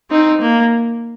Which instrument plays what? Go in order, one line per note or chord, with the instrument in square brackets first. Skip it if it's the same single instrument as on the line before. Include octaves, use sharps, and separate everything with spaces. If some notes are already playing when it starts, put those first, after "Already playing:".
[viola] C4 [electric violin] D#4
[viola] A#3